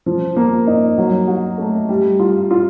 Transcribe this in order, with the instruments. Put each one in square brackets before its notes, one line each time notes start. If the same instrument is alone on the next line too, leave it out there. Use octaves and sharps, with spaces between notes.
[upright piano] F3
A#3
D#4
F#3
F#4
A3
G3
F4
F4